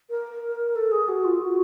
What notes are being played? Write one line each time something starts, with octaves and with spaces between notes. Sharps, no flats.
A#4
A4
G#4
F#4
F4
F#4